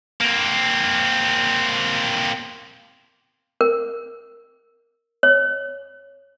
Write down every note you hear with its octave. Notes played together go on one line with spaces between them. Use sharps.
A#3 C4
A#4
C#5